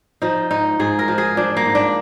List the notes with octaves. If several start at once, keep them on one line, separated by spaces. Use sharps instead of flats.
F3 D#4
G#2 D#4
G#2 G#4
A#4
F3
G#4
F3 D4
A#3
G#2
D4